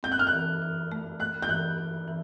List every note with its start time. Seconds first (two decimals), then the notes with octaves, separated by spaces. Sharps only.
0.03 C4 G6
0.12 F#6
0.19 F6
0.27 F#6
0.33 E3
0.62 E3
0.92 A3
1.20 A3 F#6
1.42 G6
1.49 E3 F#6
1.78 E3
2.08 E3